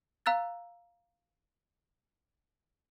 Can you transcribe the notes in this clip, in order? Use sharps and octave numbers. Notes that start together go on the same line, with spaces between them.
F5 A#5 E6 F#6 A6